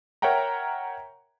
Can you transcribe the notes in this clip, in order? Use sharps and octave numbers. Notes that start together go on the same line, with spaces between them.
A#4 C#5 E5 F#5 G5 A#5